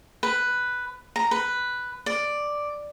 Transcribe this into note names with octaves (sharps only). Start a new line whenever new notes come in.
B4
A#5
B4
D5